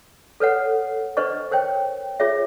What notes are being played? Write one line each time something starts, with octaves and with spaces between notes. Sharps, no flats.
A4 B4 C#5 F#5
D4 B4 C5 D#5 C#6
A#4 C5 C#5 G5
F4 G#4 C#5 E5